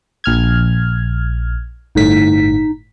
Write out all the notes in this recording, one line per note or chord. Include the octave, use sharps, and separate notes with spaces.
A#1 F6 G#6
G1 A2 D#4 B6